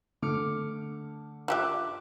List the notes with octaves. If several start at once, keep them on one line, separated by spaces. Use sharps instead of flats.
D3 A3 D6 F6 C#7
F4 G4 E5 D6 F#6 E7